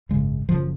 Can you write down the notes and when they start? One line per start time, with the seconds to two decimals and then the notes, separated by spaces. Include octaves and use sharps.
0.09 G#1 F#2 C#3 G#3
0.49 F#1 F#2 C#3 F3